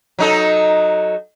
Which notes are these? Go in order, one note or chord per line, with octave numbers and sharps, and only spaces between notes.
F#3 D#4 A4